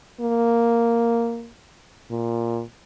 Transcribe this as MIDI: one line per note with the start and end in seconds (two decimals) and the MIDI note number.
0.21 1.50 58
2.11 2.62 46